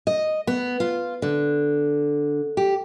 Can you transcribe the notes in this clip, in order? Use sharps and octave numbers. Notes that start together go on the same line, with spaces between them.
D#5
B3
F4
D3
G4